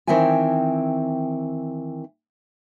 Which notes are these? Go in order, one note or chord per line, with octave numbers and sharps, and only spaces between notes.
D#3 E3 C4 E5 G5 G#5